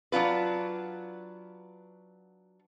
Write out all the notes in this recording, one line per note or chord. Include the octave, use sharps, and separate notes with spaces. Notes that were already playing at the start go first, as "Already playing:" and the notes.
F#3 D4 F4 B4